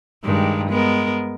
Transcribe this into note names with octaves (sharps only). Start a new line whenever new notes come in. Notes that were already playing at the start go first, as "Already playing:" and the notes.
G2 D#3 G#3
G#3 B3 A#4